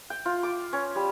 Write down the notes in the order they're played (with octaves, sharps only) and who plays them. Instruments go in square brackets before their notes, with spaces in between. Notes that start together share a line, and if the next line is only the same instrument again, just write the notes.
[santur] G5
F4
D6
C#4
G3